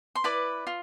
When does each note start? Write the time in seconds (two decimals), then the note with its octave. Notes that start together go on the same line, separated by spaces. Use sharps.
0.15 C6
0.24 E4 B4 D5 D6
0.67 F4